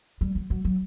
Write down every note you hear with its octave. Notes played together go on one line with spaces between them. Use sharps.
G3
F#3
F#3
F#3